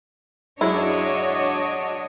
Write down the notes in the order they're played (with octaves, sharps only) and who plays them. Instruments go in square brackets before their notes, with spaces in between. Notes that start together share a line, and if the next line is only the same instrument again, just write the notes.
[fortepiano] F#2 F#3 G#3 [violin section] D4 C#5 [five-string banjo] E4 [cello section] F#4 D#5